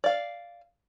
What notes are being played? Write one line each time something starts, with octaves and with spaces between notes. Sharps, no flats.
D5 F5